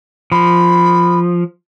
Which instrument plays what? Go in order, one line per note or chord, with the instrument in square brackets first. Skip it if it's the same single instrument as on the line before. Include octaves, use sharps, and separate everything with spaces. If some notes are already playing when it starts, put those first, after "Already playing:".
[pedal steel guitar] F3 [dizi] B5